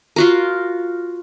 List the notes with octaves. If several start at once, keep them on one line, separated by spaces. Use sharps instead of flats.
F4 F#4 A#4